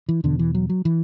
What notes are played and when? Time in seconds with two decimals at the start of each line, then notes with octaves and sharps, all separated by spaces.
0.09 E3
0.24 E2 B2 D3
0.39 E3
0.55 F#3
0.70 F#3
0.85 E3